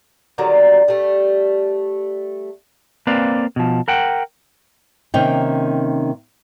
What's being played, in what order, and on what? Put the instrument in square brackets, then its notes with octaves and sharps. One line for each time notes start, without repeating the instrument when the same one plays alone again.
[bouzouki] D3 D#3 F#3 G3
G3 A3
[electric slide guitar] A#3 C4 B4 D5 F5
B2 F3
A#4 F#5 G5
[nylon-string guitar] C3 D#3 A#3 C#4 D#5 G5